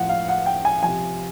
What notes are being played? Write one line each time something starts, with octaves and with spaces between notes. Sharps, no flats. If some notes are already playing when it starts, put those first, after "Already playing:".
Already playing: A2 F3 F#5
F5
F#5
G5
G#5
C3 F3 G#5